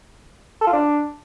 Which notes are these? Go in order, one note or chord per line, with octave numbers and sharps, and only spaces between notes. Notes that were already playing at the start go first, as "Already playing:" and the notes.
A4
F4
D4